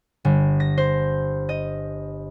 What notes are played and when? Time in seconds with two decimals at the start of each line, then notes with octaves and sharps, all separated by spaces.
0.25 G1
0.60 A#6
0.78 C5
1.49 D#5